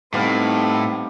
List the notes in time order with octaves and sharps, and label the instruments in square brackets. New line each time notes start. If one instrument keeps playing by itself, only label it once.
[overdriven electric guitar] A2 [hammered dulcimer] G3 B3 F5 [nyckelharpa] C4 D#4